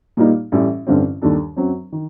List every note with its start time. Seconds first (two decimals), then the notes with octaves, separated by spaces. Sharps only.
0.17 A#2 G3 A#3 D#4
0.52 A1 A2 G3
0.87 A1 G2 D3 G3 C4
1.22 D#2 D#3 G3 D4 A4
1.56 F#2 F#3 C4
1.92 D#3